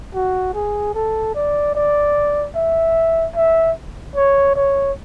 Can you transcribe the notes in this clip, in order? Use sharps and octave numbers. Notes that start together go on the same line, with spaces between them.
F#4
G#4
A4
D5
D5
E5
E5
C#5
C#5